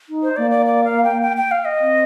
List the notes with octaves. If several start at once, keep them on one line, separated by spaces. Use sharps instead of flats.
D#4
C5
A#3 D5
D5
D5
F5
G5
G5
G5
F5
D#5
C4